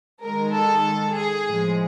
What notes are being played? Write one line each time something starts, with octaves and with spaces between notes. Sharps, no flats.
D#3 G#3 A#4
A4
G#4
A2 F3 G#3